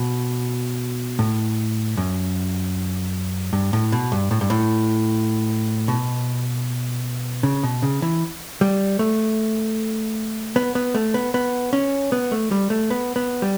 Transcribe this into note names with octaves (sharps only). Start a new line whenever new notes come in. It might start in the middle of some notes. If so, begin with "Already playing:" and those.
Already playing: B2
A2
F#2
G2
A2
B2
G2
A2
G2
A2
B2
C#3
B2
C#3
E3
G3
A3
B3
B3
A3
B3
B3
C#4
B3
A3
G3
A3
B3
B3
G3